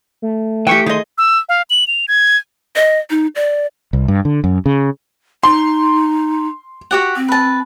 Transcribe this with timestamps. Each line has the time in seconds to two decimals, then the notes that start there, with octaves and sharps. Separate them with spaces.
0.22 A3
0.67 E3 G4 G5 C#6
0.86 D#3 G#4 D#5 C6
1.18 E6
1.49 F5
1.70 F#7
1.87 F7
2.08 G#6
2.76 D#5
3.10 D#4
3.35 D5
3.93 C2
4.08 G2
4.25 D3
4.44 F#2
4.66 C#3
5.43 D#4 C6
6.91 F#4 G4 F#5
7.16 C4
7.28 B4 A5